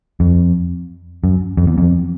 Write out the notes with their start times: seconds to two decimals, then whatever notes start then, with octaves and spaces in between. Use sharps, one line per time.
0.20 F2
1.24 F#2
1.57 F2
1.67 E2
1.78 F2